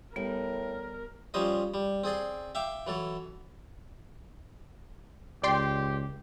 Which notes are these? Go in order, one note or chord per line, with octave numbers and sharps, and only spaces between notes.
A2 G3 B3 A#4
F3 G3 C#4 C5 D#5
G3
C4 G#4 D5 C6
E5 F5 G5 D6
E3 F#3 A4
C#2 G4 D5 G5 C6